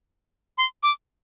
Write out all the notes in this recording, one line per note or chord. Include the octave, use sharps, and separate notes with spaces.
C6
D6